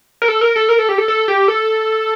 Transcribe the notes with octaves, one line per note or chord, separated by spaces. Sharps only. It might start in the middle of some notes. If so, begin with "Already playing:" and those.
A#4
A4
A#4
A4
A#4
A4
G4
A4
A4
G4
A4